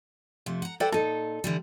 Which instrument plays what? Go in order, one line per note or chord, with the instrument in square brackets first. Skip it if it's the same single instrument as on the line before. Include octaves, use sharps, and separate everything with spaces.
[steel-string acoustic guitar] F2 C3 A3
F#5 A#5
[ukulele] A4 D5 G5 [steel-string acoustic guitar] B4 C5 F#5
[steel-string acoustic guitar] A#2 D#4 [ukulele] A4
[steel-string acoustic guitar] D3 E3 G3